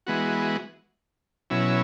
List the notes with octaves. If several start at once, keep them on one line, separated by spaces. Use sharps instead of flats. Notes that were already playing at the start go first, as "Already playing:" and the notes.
E3 G#3 B3 F#4
B2 F#3 C#4 E4